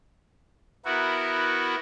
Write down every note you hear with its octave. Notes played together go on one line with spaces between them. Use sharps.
B3 E4 F#4 A#4